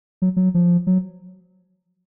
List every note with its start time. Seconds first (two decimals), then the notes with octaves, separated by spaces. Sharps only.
0.22 F#3
0.36 F#3
0.54 F3
0.87 F#3